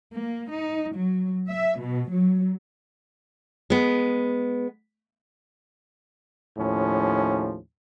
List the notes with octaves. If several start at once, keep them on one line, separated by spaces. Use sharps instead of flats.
A#3
D#4
F#3
E5
B2
F#3
G#3 B3
D#2 A2 F3 C#4